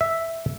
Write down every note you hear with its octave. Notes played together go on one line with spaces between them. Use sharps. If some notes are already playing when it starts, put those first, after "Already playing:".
E5